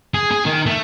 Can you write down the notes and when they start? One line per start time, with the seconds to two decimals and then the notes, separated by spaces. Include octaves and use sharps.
0.14 G#4
0.31 G#4
0.46 D#3
0.66 A3